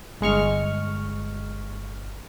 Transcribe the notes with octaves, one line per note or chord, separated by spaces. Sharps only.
G1 G#3 C#6 F6